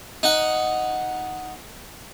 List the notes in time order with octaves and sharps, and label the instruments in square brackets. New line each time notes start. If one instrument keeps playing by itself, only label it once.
[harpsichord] D#4 F#5